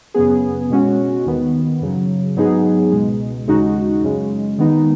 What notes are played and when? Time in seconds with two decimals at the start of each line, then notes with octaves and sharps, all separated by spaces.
0.14 F#2 C#3 B3 G#4
0.70 B2 G#3 C#4 F#4
1.25 D#2 D#3 B3
1.81 F#2 C#3 F#3
2.36 G#2 F#3 B3 D#4 G#4
2.92 C#2 B2 G#3
3.47 D#2 C#3 G#3 D#4 F#4
4.03 F#2 C#3 G#3
4.58 D#3 G#3 B3 D#4